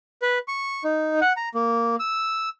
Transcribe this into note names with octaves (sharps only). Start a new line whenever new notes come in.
B4
C#6
D#4
F#5
A#5
A#3
E6